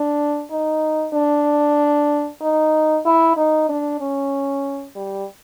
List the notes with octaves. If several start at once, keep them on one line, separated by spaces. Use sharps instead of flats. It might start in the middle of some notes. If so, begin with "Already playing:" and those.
Already playing: D4
D#4
D4
D#4
E4
D#4
D4
C#4
G3